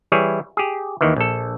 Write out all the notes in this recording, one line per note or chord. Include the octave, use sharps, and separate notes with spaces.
E3 G3 E4 G#4 C#5
G4 G#4
D#2 D#3 E3
A#1 A4